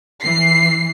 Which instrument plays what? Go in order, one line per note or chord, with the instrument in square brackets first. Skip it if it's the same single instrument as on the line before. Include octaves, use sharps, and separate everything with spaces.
[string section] E3 C7